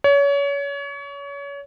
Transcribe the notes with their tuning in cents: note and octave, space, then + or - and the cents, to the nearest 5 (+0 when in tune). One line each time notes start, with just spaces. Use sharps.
C#5 +30